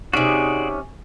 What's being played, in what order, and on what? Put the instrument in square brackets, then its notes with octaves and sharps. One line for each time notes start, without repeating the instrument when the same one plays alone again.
[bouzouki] C3 C#4 [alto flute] D#4 [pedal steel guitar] F#4 G#4 D5 [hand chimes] G#5 C#6